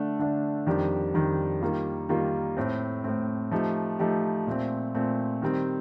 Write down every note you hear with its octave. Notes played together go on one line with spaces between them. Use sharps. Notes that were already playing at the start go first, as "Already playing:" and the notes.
Already playing: D3 A3 D4
D3 A3 D4
F2 D#3 G3 D4 G4
F2 D#3 G3 D4 G4
D#3 G3 A#3 F4
D#3 G3 A#3 F4
A2 A3 C4
A2 A3 C4
F3 A3 D#4 G4
F3 A3 D#4 G4
A#2 A3 C4
A#2 A3 C4
D#3 G3 C4